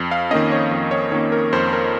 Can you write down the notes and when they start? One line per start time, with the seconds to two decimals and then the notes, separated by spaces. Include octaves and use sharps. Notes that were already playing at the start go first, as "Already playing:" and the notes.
Already playing: F2
0.11 F5
0.31 D#3 A#3 C#4 D#5
0.52 C#5
0.71 F2
0.91 C#5
1.12 D#3 A#3 C#4 C#5
1.32 A#4
1.53 F2 C5
1.73 A#4